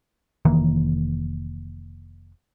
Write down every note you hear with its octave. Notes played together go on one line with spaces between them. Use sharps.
F1 D#3 E3 A#3